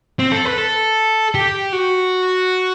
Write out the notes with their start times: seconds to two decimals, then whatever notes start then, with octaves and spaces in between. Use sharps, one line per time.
0.19 C4
0.32 A4
0.45 B4
0.58 A4
1.35 G4
1.73 F#4